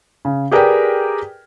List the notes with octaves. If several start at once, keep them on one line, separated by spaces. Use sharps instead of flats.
C#3
G4 G#4 A#4 B4 D5 G5